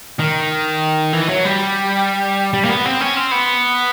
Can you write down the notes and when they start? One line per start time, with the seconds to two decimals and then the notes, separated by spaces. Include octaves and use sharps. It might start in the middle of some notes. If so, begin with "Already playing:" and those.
0.19 D#3
1.13 E3
1.29 F#3
1.44 G3
2.54 G3
2.65 A#3
2.69 B3
2.85 C4
3.01 C#4
3.17 C4
3.32 B3